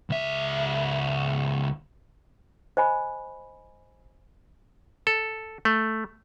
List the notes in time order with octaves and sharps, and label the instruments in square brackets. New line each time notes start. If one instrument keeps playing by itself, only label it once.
[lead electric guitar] C#2 E5
[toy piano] C5 D#5 G#5 B5
[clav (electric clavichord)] A4
A3